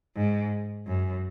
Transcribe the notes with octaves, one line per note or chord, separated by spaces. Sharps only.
G#2
F#2